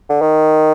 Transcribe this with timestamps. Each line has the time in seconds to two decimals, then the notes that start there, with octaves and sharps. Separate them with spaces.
0.09 D3
0.21 D#3